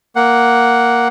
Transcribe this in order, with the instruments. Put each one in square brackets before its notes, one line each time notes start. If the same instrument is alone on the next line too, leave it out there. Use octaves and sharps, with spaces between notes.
[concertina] A#3 F#5